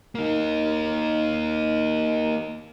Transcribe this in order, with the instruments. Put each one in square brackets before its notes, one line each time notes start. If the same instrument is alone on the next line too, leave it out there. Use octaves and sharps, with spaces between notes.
[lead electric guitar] A#3 D#4